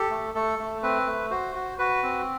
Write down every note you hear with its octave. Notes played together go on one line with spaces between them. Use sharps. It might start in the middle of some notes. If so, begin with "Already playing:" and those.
Already playing: G4 A4
A3
A3 A4
A3
C4 B4
A3
F#4 C5
F#4
F#4 B4
C4